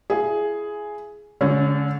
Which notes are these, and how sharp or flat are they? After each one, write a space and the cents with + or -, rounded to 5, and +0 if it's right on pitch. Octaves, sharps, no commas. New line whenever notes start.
E4 +30 G#4 +5
D3 -30 G#3 +20 C#4 +0